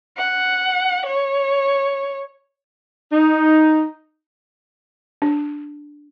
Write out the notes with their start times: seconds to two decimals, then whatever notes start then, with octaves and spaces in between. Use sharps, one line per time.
0.17 F#5
1.06 C#5
3.12 D#4
5.22 D4